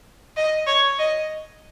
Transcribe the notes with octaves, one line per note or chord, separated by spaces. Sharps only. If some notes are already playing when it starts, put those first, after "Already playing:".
D#5
C#5
D#5